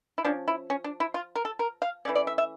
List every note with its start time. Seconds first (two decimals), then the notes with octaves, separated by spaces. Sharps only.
0.18 E4
0.25 F3 C#4 D4
0.48 E4
0.70 C#4
0.84 D4
1.00 E4
1.14 F4
1.35 A#4
1.45 A4
1.59 A#4
1.82 F5
2.05 E3 A3 C#4 D5
2.15 D5
2.27 E5
2.38 E5